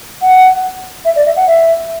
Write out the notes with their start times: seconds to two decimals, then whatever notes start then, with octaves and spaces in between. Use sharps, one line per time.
0.22 F#5
1.05 E5
1.16 D5
1.26 E5
1.36 F#5
1.47 E5